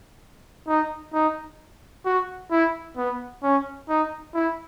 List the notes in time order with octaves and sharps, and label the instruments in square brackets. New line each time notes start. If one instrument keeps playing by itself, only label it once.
[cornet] D#4
D#4
F#4
E4
B3
C#4
D#4
E4